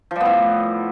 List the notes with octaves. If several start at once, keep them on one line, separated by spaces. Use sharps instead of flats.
A2 F3 G3 B3